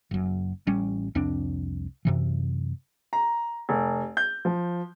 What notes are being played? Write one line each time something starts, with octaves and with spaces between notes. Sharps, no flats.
F#1 F#2
A1 G3 C#4
C2 F2 C4 D4
F#2 C3 E3
A#5
F1
G6
F3